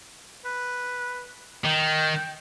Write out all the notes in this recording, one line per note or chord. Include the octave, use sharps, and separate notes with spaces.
B4
D#3 G5